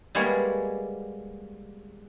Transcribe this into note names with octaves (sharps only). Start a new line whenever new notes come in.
G3 G#3 A#3 B3 C#5